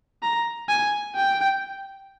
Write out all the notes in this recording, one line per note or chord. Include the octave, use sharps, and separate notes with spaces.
A#5
G#5
G5